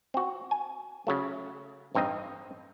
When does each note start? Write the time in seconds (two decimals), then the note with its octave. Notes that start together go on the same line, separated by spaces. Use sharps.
0.14 C4 F#4
0.51 G#5
1.07 C#3 F#3 A3
1.95 A1 G2 C4 D#4 D#5